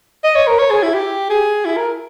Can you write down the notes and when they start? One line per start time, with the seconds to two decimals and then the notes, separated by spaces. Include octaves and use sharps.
0.24 D#5
0.35 C#5
0.47 A#4
0.59 C#5
0.71 G#4
0.83 E4
0.94 G4
1.30 G#4
1.65 E4
1.77 A#4